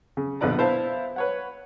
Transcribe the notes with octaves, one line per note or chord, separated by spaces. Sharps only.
C#3
A#1 B2 D3 B4 D5 A#5
B3 E4 C5 E5 F5 A5
B4 C#5 F#5